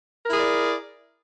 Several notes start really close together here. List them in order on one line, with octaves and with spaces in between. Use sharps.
A#4 E4 G#4 D5